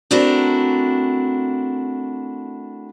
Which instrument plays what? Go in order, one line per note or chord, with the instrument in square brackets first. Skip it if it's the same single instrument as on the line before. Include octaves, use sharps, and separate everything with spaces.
[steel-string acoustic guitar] A3 C4 D4 E4 F#4 A#4